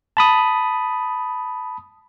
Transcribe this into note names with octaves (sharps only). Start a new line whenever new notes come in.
A5 B5 D#6